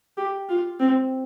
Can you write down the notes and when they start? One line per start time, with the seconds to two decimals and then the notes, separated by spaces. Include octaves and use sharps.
0.17 G4
0.49 F4
0.80 C4